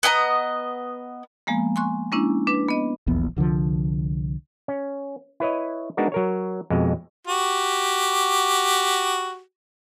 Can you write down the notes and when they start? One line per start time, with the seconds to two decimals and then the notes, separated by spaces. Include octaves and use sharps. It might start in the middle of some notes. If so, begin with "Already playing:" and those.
0.03 B3 D#5 G5 A#5
1.47 F3 G#3 A#3 B3
1.76 G#5 C6 C#6 F#6
2.12 G#3 A#3 C#4 D4 E4
2.47 D4 B4
2.68 B3 D#5
3.07 D#1 A#1 E2 B3
3.37 C2 D3 D#3 F3
4.68 C#4
5.40 E4 B4 C#5 D#5
5.97 G#3 B3 D4 D#4 F#4 A#4
6.12 F#3 A#4 C#5
6.70 F2 B2 G#3
7.27 F#4 G4